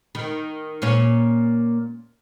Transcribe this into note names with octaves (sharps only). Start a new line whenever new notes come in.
D#3
A#2 A#3 C#4